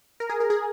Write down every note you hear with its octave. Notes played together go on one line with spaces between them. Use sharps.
A#4
G#4
A#4
G#4